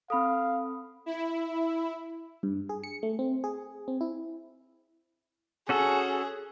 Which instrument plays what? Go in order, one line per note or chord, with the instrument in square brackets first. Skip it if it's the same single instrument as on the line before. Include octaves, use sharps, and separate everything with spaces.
[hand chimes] C4 A4 [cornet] F5 [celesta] B5 D#6
[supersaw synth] E4
[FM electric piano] G2
G#4
C#7
A3
C4
G#4
C4
E4
[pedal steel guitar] C#4 F#4 A4 [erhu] G#4